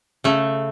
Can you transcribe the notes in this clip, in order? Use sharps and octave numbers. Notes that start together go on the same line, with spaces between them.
C#3 A3